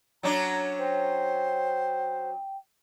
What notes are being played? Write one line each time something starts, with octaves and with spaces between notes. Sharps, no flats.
F#3 C#4 D4 A#5
C5 G5